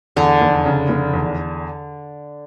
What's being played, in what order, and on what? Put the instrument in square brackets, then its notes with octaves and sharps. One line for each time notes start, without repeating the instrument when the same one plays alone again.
[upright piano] E2 [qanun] D3
[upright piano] F1
C#3
F1
E2